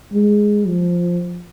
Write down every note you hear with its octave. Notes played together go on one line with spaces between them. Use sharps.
G#3
F3